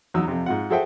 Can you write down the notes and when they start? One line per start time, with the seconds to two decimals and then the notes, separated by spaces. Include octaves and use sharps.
0.14 E2 F#3 D#4 A#5 E6
0.28 F2 C3
0.46 G#2 F4 F#5
0.70 F#4 G#4 A4 C5 E5 G5